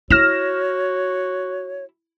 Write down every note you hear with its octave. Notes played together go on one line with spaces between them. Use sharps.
E4 F#4 C#5 F6 A#6 E7